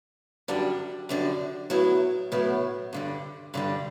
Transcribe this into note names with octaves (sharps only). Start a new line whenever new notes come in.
F#2 D3 G3 D4
F#2 D3 G3 D4
A2 F#3 B3 E4
A2 F#3 B3 E4
G2 D3 G3
G2 D3 G3